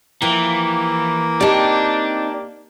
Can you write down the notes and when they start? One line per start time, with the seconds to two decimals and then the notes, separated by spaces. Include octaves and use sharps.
0.22 E3 F3 A#3 G4
1.41 C4 D#4 G4 D5 A5